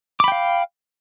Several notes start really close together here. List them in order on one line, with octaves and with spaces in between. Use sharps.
D6 B5 G5 F5